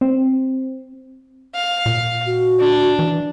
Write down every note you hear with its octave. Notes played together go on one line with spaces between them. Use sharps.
C4
F5
A#2
F#4
D4
E3